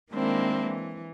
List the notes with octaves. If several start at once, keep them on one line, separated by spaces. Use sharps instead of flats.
D#3 G#3 A#3 C4 D4 E4
E3